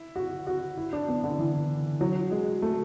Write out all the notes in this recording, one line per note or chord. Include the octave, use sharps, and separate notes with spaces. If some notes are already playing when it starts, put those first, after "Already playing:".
Already playing: E4
F#4
F#4
E4
D4
B3
D3
E3
F#3
G#3
A3